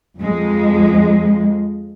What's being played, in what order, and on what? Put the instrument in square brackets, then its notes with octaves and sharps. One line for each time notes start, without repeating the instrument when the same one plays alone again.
[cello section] F2 F3 G#3